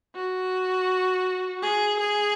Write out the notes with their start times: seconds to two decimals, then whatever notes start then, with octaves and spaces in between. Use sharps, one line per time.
0.16 F#4
1.62 G#4
2.00 G#4